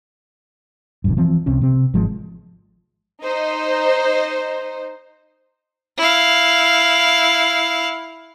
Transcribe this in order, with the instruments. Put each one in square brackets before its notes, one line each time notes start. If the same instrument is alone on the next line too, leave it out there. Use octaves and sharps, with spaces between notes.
[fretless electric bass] F1 B1 G2
E3 F3 C4
C2 C3 C4 C#4
C3 C4
G#1 F3 G#3
[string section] D#4 C5
[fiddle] E4 F5